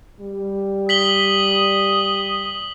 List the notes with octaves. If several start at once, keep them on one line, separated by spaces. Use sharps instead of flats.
G3
D#6 B6 F#7 G7